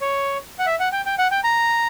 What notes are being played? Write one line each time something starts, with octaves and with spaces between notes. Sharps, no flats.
C#5
F#5
E5
F#5
G5
G5
F#5
G5
A#5